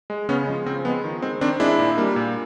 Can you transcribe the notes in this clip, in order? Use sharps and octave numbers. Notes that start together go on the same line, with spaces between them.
G#3
C#3 B3 C#4
F3 G#3
C#3 C4
F3 G#3 B3
D#3
G#3 C4
D#3 C4 D4
G#3 D4 E4
A#2
G3 A#3
A#2